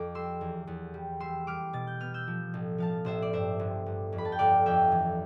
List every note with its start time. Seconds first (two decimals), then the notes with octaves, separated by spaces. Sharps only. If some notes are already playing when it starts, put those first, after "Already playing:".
Already playing: F2 D6
0.15 G3 C6 E6
0.41 E2
0.67 E2
0.94 G3
1.20 G3 C6 E6
1.47 G3 D6 F6
1.73 B2 A6
1.87 G6
2.00 B3 F6
2.14 E6 G6
2.27 F3
2.54 A1
2.78 F3 F5 A5
3.05 A1 C5 E5
3.22 D5
3.33 G2 C5 E5
3.59 G1
3.86 G1
4.12 F2
4.18 B5
4.25 A5
4.32 G5
4.39 G1 D5 F5
4.66 F2 E5 G5
4.92 E3